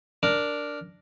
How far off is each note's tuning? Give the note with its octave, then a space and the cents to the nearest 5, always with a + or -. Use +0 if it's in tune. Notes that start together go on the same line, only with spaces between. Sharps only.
D4 +0 A#4 +0